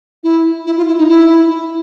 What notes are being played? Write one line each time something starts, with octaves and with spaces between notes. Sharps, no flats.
E4
E4
F4
E4
D#4
E4